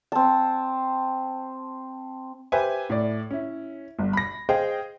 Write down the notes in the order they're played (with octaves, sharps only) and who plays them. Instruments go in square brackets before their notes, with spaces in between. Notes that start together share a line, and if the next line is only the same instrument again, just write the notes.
[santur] C4 A5
[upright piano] G4 B4 C5 E5 G#5
A2 D5
C#4 E4
G1
B5 A#6
G#4 C5 D#5 F5 G5